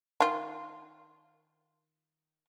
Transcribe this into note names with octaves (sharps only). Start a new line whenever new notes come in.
D#3 F4